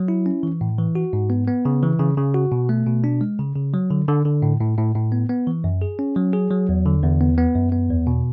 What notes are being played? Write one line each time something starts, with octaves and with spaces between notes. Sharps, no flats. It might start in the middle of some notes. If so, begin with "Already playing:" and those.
Already playing: F#3
E4
C#4
E3
A2
E3
F#4
G#2
B3
B3
C#3
E3
C#3
C#3
F#4
B2
A3
B2
D4
G#3
C#3
C#3
F#3
D3
D3
D3
A2
A2
A2
A2
B3
B3
E3
F#2
G#4
C#4
F#3
G#4
F#3
E2
D3
E2
B3
B3
F#2
B3
E2
B2